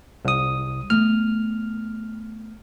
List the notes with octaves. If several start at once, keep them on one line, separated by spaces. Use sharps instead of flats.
C2 D#6
A3 B3 F6